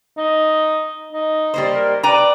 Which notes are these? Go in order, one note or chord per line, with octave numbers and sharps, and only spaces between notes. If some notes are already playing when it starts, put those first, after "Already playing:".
D#4
D#4
G3 A#3 C5
A#4
B4 D5 G5 A#5